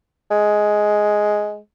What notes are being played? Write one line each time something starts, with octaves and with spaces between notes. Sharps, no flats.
G#3